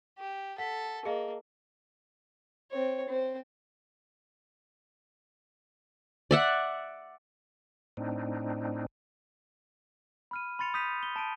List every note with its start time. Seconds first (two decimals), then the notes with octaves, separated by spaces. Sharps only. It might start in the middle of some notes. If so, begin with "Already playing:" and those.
0.19 G4
0.58 A4 F#5 B6
1.05 A#3 G#4 D#5 F5
2.71 C4 C#5
3.08 C4 C5
6.31 D5 E5 F#5
7.97 A2 C4 D4 D#4
10.31 B5 F6 D#7
10.59 B5 C6 A6 C#7 F7
10.74 D#6 F6 G6 B6 D#7 F7
11.03 G7
11.16 A5 D7 D#7